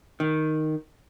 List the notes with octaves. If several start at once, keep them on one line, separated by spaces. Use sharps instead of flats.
D#3